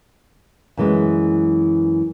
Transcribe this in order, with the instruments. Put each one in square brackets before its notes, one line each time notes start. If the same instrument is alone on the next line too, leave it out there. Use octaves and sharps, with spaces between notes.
[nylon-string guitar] F#2 E3 G#3